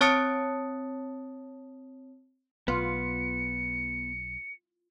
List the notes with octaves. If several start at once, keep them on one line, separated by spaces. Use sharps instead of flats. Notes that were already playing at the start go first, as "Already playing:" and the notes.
C4 C#5 A5 D#6 A6 C#7
B1 B3 F4 C#7